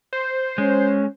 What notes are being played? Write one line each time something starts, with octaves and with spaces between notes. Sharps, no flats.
C5
G#3 C#4